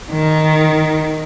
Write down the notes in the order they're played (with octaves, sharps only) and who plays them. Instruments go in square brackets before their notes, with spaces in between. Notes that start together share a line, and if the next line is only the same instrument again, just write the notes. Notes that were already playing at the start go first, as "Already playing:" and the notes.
[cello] D#3